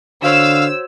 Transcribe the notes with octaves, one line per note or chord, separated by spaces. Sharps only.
D3 F#4 C5 C#5 F5 E6